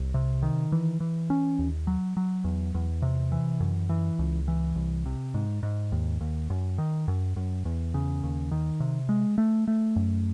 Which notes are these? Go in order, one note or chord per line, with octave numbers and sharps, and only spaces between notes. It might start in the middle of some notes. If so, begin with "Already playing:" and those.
Already playing: C2
C3
D#3
E3
E3
C#4
D#2
F#3
F#3
E2
E2
C3
E3
F#2
E3
C#2
E3
C2
C3
G#2
G#2
D#2
D#2
F#2
D#3
F#2
F#2
E2
C#3
D#2
D#3
C3
G#3
A3
A3
F#2